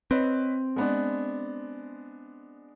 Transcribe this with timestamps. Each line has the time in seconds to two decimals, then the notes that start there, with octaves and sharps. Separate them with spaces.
0.11 C4 B4 C#5 D#5
0.76 G#3 B3 D4